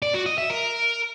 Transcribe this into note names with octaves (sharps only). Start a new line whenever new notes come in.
D5
F#4
D#5
E5
A#4